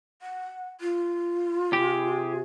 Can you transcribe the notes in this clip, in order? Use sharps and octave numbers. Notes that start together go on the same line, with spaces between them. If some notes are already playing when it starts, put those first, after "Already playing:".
F#5
F4
C3 G4 G#4